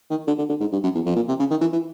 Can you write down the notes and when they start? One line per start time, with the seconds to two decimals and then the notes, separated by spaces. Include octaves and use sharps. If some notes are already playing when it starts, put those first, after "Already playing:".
0.10 D#3
0.27 D3
0.38 D3
0.49 D3
0.60 G#2
0.72 G2
0.83 F#2
0.95 E2
1.06 F2
1.16 A#2
1.28 C3
1.39 C#3
1.50 D#3
1.61 E3
1.73 E3